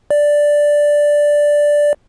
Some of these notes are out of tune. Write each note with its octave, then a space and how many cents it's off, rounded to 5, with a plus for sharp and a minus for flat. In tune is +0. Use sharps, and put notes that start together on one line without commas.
D5 +0